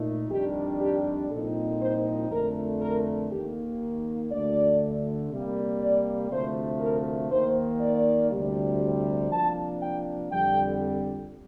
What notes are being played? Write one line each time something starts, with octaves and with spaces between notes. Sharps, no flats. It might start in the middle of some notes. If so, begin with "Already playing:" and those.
Already playing: A#2 A3 D#4
F2 D#3 G3 D4 G4
G4
C2 A#2 F3 C4 D#4 A4
C5
F2 D3 A3 A#4
A#4
D#2 D#3 A#3 G4
D2 D3 A3 D5
C3 G3 A#3
D5
D2 C3 F3 A3 C5
A#4
D#2 D#3 A#3 C5
D5
D2 C3 G3
C3 F3 A#3 D4 A5
G5
F2 D3 G3 G5